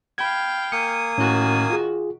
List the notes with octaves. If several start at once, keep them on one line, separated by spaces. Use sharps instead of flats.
F5 G5 B5 G#6
A#3 G#5 D#6 C#7
A2 D#3 C#4 F#4
F4 G#4